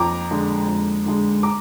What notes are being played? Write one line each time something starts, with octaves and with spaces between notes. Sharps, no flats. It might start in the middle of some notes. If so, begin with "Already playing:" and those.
Already playing: F2 A#5 D6
D3 G#3
F2
D3 G#3
A#5 D6